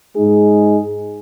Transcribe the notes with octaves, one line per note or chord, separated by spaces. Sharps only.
G#2 G#3 D#4 G#4